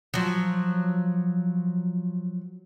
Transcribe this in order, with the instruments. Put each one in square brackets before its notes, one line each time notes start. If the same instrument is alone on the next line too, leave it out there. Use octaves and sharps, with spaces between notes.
[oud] F3 F#3